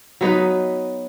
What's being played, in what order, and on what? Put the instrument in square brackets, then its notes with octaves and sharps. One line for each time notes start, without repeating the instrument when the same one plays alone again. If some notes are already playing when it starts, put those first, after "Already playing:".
[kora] F#3 B3 D#4 B4